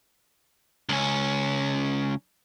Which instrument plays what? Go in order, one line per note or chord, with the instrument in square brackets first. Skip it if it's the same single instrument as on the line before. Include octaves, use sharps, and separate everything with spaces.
[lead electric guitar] C#2 C#4